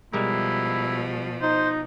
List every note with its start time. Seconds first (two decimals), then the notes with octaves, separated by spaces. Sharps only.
0.13 B2 F3 G3 G#3 E4 A#4
1.42 D#4 C5